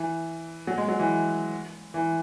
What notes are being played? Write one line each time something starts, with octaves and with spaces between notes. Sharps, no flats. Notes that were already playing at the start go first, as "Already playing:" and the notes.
Already playing: E3
F#3
G#3
F#3
E3
E3